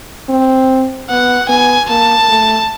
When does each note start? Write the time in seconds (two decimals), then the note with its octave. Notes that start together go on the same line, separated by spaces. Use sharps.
0.29 C4
1.10 B3 F#5
1.49 B3 G#5
1.90 A#3 A5
2.29 A3